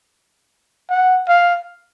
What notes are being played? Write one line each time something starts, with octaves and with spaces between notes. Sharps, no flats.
F#5
F5